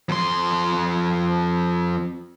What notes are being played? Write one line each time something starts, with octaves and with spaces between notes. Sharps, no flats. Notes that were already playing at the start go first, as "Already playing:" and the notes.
F2 C6